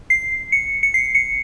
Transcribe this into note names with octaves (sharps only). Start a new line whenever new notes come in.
C7
C#7
C#7
C7
C#7